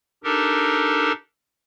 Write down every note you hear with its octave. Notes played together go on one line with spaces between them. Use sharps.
D4 D#4 G4 A4 A#4